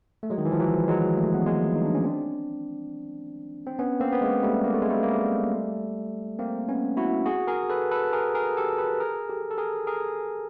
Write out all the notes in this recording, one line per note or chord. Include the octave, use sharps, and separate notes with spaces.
A3
F#3 G#3
D#3
E3
F3
E3 F#3
F#3 G#3
G3 A3
B3
G#3 A#3
D#4
D4
C#4
C4 D4
C4
B3 C#4
A#3 C4
B3
G#3 A#3
G3 A3
A#3
A3
G#3
G3 A3
A#3
G3 A3
A#3 C4
B3 C#4
E4 F#4
F#4 G#4
G#4 A#4
A4 B4
A4 B4
G#4 A#4
G#4 A#4
G4 A4
A4 B4
G#4 A#4
G4 A4
A4
G#4 A#4
G#4 A#4